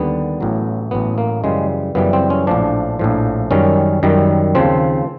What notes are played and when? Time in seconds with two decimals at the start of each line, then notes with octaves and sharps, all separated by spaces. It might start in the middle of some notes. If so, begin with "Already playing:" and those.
Already playing: D#2 D3 G3 B3
0.41 A1 A2 F#3
0.91 A1 A2 F#3 B3
1.18 A#3
1.44 F#2 C#3 E3 G3 G#3
1.95 F#2 C#3 E3 G3 B3
2.13 C4
2.30 C#4
2.47 A#1 A2 F3 D4
2.99 A#1 A2 F3
3.51 F#2 D#3 G3 C#4
4.03 F#2 D#3 G3
4.55 D#2 C#3 F3 C4